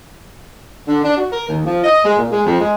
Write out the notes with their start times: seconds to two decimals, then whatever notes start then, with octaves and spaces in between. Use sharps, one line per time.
0.87 D3
1.03 D4
1.17 F#4
1.31 A#4
1.49 D#2
1.65 F3
1.84 D#5
2.04 G#3
2.19 A#2
2.31 G#3
2.45 F2
2.60 G#3